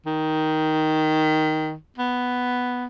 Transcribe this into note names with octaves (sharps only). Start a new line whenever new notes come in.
D#3
B3